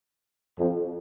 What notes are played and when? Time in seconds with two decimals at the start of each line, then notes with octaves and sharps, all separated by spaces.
0.58 F2